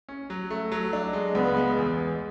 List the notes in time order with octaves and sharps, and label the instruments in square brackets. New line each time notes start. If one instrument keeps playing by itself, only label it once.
[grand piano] C#4
F#3
A3
F#3
D4
G#3
[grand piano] C#2 [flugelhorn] B3
[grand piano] G#3
E2
G#3